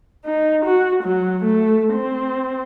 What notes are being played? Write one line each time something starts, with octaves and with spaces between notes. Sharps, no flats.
D#4
F#4
F#3
A3
C4